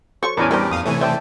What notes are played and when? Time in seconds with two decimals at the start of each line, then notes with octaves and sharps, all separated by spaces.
0.23 F#3 A4 C5 C#6
0.37 E2 A2 C#4 A#4 D5 G#5
0.51 G3 D4 E4 G4 A#4 C5 D5
0.71 F2 F5 D#6
0.86 C3 E3 A3 C#5 G#5
1.01 C5 D5 E5 G5 A5